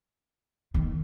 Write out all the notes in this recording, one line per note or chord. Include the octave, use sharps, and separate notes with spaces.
D#3